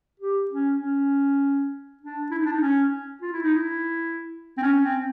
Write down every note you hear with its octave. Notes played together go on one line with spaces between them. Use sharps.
G4
C#4
C#4
D4
E4
D#4
D4
D#4
C#4
F4
E4
D#4
E4
C4
C#4
C4